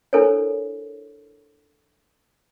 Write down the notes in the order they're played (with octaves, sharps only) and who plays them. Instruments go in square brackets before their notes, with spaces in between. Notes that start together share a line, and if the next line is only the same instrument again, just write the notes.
[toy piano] D4 E4 A4 A#4 C5 C#5